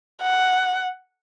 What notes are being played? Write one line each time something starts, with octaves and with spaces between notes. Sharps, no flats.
F#5